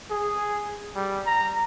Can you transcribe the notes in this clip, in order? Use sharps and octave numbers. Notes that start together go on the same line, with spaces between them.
G#4
G3
A#5